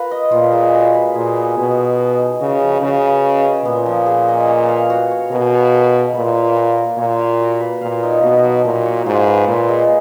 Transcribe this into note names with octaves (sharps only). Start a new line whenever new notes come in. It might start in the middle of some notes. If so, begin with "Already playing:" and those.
Already playing: F4 A#4 B4
D#5
A#2 F4
G#3
F#4
B4
A#2 G#4
B3
B2 G#4
B3
D#5
D#4
C#3 F#4
F3
C#3 F#4
B4
D#5
C#4
A#2 B3
F3
G#4
D#5
C#5
F5
F#4
C#5
B2 A#4
F5
A#4
D#5
A#2 B4
F5
F4
A#4
A#2 C#5
F5
F#4
B4
A#2 F5
D#4
B2 F#4
F#3
A#2 A#4
C#5
G#2 F4
B4
A#2 F4
G#3